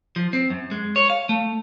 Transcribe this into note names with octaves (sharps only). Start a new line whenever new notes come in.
F3
C4
F#2
G#3
C#5
F5
A3